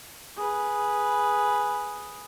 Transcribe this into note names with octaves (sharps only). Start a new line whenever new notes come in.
G#4 B4